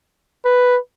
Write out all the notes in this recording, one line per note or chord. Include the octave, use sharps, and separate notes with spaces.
B4